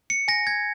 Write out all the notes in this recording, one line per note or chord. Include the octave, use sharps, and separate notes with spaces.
C#7
G#5 A#6
G#6